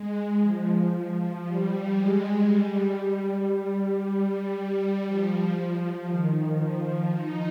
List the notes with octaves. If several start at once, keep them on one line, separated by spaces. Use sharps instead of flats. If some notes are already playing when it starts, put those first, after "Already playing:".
Already playing: G#3
F3
F3
G3
G#3
G3
G3
F3
D#3
F3
D#4